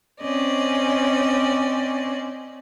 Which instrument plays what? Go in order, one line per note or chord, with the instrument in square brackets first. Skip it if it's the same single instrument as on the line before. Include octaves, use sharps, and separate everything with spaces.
[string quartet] C4 C#4 D5 D#5